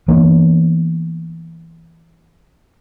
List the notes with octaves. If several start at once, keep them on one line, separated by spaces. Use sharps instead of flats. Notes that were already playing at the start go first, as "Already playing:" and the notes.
E3 A#3 B3 D4